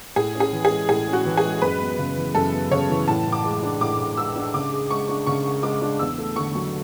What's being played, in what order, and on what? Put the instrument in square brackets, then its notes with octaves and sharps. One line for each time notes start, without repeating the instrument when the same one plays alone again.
[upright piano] A2 [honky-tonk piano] G#4
[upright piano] C#4
[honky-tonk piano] G#4
[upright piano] E3
[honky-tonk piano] G#4
[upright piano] G#3
[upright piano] A2 [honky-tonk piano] G#4
[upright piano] C#4
[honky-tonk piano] F#4
[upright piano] E3
[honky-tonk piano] G#4
[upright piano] G#3
[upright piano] F#2 [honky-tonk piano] B4
[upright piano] B3
C#3
E3
[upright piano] F#2 [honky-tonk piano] A4
[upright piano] B3
[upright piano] C#3 [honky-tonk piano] C#5
[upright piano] E3
[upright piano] A2 [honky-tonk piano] A5
[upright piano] A2
[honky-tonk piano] D6
[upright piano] G#3
D4
[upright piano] A2 [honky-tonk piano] D6
[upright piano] A2
[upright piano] G#3 [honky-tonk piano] E6
[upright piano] D4
[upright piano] C#3 [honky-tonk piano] D6
[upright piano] G#4
[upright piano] G#3 [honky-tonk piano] C#6
[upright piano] D4
[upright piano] C#3 [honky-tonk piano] C#6
[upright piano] G#4
[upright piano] G#3 [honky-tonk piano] D6
[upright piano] D4
[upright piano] E2 [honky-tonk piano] E6
[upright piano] A3
[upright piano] D3 [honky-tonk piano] C#6
[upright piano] F#3